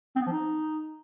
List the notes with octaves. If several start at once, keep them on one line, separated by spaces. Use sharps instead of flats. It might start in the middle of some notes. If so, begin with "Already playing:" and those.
C4
B3
F3
D#4